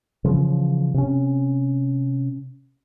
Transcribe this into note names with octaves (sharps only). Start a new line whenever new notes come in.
C#3 E3 F3
C3 C#4